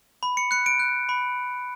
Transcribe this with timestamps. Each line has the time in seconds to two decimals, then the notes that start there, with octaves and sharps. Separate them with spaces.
0.23 B5
0.37 C#7
0.51 F#6 C#7
0.66 D7
0.80 F#6
1.09 B5